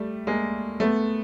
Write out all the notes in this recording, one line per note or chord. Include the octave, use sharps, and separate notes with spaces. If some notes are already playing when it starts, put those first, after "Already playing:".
Already playing: G3 A3
G#3 A#3
A3 B3